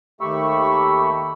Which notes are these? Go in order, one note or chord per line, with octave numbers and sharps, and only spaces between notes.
D#2 A3 G4 B5 C#6 E6